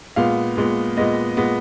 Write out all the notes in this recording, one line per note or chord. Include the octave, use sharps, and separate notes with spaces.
A#2 G#3 B3 F5
A#2 G#3 B3
A#2 G#3 B3 D#5
A#2 G#3 B3